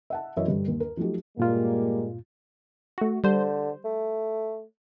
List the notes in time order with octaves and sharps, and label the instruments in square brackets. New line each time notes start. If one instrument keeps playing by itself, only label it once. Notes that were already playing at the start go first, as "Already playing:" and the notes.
[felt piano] E5 F#5 A5
F#2 E3 C#5 D#5 E5
G2 D3 G3
D#2
A#4
F3 F#3 A3 D#4 G4
[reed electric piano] G2 A#2 F4 [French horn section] G3 G#3 A#3
[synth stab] A3 F#4
[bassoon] D3 [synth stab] G3 C5
[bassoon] A3